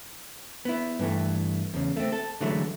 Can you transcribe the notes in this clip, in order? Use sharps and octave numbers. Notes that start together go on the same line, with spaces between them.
B3 E4
G2 E3 A3
E2 C#3
A3 C4
A4
D3 E3 F#3 G#3 A3